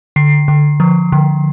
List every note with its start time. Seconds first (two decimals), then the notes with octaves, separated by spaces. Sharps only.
0.16 D3 C7
0.48 D3
0.80 F3
1.12 D3